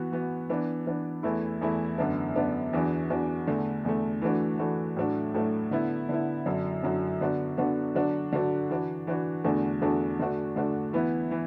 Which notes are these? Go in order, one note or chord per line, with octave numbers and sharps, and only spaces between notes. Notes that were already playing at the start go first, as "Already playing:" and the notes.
Already playing: E3 B3 F#4
E3 B3 F#4
E3 B3 D4
E3 B3 D4
E2 E3 A3 E4
E2 E3 A3 E4
F#2 D3 B3 D4
F#2 D3 B3 D4
E2 E3 D4 F#4
E2 E3 D4 F#4
E2 D3 A3
E2 D3 A3
E3 A3 D4 F#4
E3 A3 D4 F#4
A2 F#3 A3 D4 F#4
A2 F#3 A3 D4 F#4
D3 B3 E4
D3 B3 E4
F#2 D3 F#3
F#2 D3 F#3
D3 B3 D4 F#4
D3 B3 D4 F#4
D3 F#3 D4 F#4
D3 F#3 D4 F#4
E3 D4 F#4
E3 D4 F#4
E2 D3 A3 D4 F#4
E2 D3 A3 D4 F#4
D3 A3 D4 F#4
D3 A3 D4 F#4
E3 B3 E4
E3